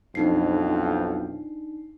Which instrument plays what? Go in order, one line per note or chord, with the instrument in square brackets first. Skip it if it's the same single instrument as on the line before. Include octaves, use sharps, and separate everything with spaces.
[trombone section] B1 F2 [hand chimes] D4 D#4 C7